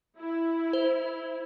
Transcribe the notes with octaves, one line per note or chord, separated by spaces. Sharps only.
E4
C5